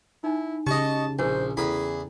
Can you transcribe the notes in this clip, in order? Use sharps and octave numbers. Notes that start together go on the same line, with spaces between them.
D#4 E4 G#5
C#3 G4 G#4 D#5 A5 C#6
A#1 E4 C5 G#5
E2 E4 G#4 A4 G5 B5